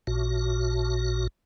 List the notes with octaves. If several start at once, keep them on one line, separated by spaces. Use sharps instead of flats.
A1 A#2 F#4